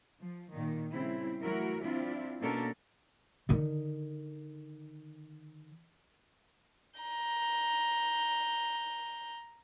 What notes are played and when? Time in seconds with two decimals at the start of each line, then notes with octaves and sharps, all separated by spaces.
0.20 F3
0.53 A#2 D#3
0.91 C#3 G3 C4 E4
1.40 E3 F#3 A3 E4 F#4 A#4
1.82 C4 D4 E4 F4
2.39 B2 A#3 C#4 D4 A4 A#4
3.49 D3 D#3
7.00 A#5 G6